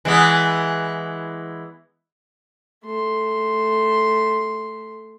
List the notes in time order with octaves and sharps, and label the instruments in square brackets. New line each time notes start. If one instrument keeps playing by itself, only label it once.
[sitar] E3 G#3 B3
[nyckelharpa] A3 C6